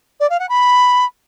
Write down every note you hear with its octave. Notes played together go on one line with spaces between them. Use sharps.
D5
F5
F#5
B5